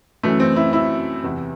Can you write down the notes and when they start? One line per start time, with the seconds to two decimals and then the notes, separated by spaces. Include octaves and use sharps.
0.23 F#2 E3 A3
0.40 C4
0.56 E4
0.73 E4
1.23 E2 C3 E3